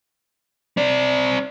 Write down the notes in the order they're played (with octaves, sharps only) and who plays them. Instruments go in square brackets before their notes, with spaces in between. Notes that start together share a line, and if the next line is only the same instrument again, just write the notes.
[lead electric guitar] C4 D5